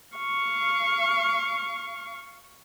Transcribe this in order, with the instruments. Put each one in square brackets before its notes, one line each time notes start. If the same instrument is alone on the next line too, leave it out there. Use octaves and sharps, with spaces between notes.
[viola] F5 C#6